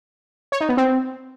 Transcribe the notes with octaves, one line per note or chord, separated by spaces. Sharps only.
C#5
D#4
B3
C4